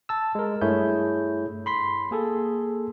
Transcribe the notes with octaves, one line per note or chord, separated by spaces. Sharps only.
A5 E6
G#3 A#4
G2 A3 E4 G#4 C#5 G6
B5 C6 B6
A#3 G#4 A4